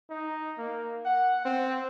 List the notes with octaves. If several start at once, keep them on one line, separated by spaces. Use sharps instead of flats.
D#4
A#3
F#5
C4